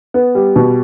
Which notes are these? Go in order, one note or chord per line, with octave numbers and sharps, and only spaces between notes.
B3
G3
B2